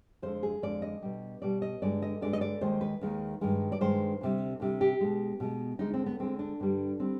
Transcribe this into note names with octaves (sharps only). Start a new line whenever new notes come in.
F2 D3 G#3 C5
G#4
F2 D3 G#3 D5
D#5
B2 G3
B2 G3 D5
D#5
G2 D3 G#3 D5
D#5
G2 D3 G#3 D5
D#5
D5
D#2 D#3 G#3 C5
B4
D#2 D#3 G#3
G2 D#3 G#3
D5
G2 D#3 G#3 C5
D2 C3 G3
D2 C3 G3
G4
B2 G#3
B2 G#3
D2 D3 G#3 D#4
C4
B3
D2 D3 G#3 C4
D4
G2 D3 G3
D3 G3 C4